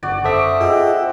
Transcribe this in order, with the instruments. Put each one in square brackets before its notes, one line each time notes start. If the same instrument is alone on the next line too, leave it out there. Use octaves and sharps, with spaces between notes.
[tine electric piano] G1 [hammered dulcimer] F#4 D5
[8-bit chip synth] F#2 A5 D#6 [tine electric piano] A4 C5 E5
[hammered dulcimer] C4 [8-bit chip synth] F4 G#4 D#5